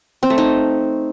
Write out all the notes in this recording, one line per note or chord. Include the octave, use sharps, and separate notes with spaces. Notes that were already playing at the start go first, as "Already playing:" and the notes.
C4
A3
D#4